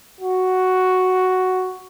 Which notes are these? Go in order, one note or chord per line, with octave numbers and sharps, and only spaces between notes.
F#4